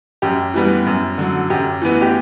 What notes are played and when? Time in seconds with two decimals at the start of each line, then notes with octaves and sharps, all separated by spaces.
0.22 F#2 G4
0.54 E3 G3 B3
0.86 F#2
1.18 D3 F#3
1.50 F#2 G4
1.82 E3 B3
2.02 G4